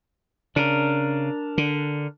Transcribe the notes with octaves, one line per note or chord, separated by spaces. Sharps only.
C#3 D4 A#4
D3